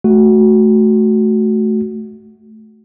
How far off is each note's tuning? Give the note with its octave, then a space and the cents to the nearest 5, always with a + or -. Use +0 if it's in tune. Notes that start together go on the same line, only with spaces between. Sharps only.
A3 -20 F#4 +0